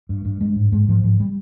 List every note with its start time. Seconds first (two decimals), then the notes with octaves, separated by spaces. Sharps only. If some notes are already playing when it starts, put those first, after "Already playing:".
0.09 G2
0.25 G2
0.41 G2 G#3
0.56 G#2
0.72 G#2 G#3
0.88 G#2 F3
1.03 G#2 F3
1.20 G3